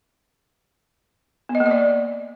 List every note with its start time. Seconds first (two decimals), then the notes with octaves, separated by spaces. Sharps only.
1.49 B3
1.55 D#5
1.60 A#3
1.66 D#5
1.71 D5